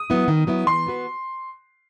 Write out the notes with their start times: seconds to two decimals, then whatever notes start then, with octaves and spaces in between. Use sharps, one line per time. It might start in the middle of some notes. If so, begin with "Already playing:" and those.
Already playing: D#6
0.10 F#3 B3 E4
0.28 D#3
0.47 F#3 B3 E4
0.67 E3 C6
0.87 B3 F#4 B4